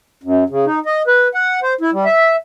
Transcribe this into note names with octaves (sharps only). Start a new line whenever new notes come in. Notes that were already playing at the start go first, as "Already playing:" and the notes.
F#2
C#3
D#4
D#5
B4
F#5
C5
E4
G3
E5